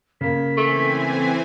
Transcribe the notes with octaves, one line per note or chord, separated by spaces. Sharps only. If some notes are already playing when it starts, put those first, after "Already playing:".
C#3 A#3 B6
E3 A3 C4 G#5